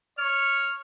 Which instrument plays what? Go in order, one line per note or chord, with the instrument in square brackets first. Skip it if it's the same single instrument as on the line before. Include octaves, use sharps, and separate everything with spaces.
[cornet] C#5 [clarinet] F6